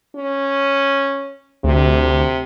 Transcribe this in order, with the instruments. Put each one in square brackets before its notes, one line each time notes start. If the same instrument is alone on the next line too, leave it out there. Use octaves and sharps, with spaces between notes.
[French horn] C#4
[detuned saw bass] D2 [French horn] C3